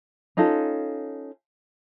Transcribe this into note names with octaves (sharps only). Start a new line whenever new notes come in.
C#4 D#4 F4 A4